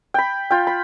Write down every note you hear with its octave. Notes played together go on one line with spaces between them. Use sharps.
G5 B5
F4 G5
B5